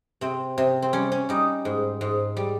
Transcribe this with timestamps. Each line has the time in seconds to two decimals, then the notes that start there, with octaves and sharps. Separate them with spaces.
0.21 C3 C4
0.58 C3
0.82 C4
0.93 G3 C#4
1.12 C#4
1.29 G3 D#4
1.65 G#2
2.01 G#2
2.37 G3